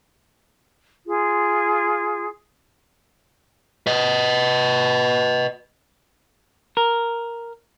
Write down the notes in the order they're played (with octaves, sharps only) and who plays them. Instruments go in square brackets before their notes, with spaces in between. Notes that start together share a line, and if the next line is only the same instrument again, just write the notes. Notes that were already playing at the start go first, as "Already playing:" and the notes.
[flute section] F4 G#4
[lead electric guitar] B4 D#5
[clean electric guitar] A#4